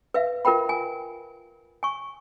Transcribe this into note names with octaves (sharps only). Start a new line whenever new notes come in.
B4 E5 F5
F4 A#4 B4 G5 B5
G#5
G#5 C#6